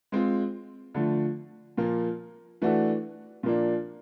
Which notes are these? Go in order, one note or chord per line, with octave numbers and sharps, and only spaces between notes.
G#3 C4 F4
D3 F3 A3
A#2 F3 A#3
E3 A3 D4 F#4 A4
A#2 F3 A#3 D4